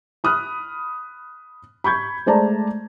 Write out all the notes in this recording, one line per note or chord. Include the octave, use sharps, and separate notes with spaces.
B5 D#6 F6 F#6
B5 C#6 G6 G#6
G#3 A3 C5 D5 A5 A#5